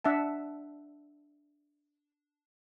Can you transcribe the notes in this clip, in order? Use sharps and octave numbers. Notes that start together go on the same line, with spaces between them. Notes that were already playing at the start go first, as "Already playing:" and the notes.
D4 E5 F#5 A5